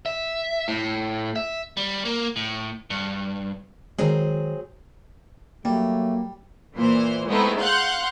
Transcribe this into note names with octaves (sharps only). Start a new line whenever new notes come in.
E5
A2
E5
G3
A#3
A2
G2
D#3 F#3 G#3 C4 G#4
F#3 G3 A3 A#3
A#2 E3 C5
G#3 A3 B3 C4 D#4 E4
F5 F#5 C6 F#6 G6